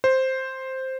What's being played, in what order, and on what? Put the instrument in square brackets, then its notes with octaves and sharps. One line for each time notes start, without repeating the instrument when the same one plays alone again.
[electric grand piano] C5